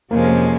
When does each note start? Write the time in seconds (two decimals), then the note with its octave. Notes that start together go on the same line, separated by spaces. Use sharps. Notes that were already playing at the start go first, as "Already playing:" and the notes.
0.11 F2 C3 F3 G#3 A#3 C#4
0.28 A#3